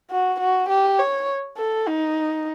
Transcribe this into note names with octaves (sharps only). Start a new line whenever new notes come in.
F#4
F#4
G4
C#5
A4
D#4